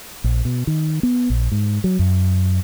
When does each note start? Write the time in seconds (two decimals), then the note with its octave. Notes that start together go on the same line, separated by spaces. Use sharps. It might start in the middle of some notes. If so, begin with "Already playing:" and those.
0.24 A#1
0.45 B2
0.67 D#3
1.03 B3
1.30 A#1
1.52 G#2
1.84 F#3
1.99 F#2